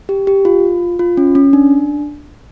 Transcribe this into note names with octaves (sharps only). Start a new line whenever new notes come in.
G4
G4
F4
F4
C#4
C#4
D4